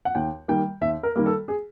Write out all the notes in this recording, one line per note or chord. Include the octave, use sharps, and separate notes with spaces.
F#5
D#2 G5
D#3 G3 A#3 G5
D#2 E5
A#4
D#3 G3 A#3
A4
G#4